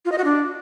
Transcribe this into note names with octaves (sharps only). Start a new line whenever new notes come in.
F4
D#5
F#4
D4